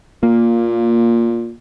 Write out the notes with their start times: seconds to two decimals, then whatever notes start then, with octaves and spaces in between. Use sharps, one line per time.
0.23 A#2 A#3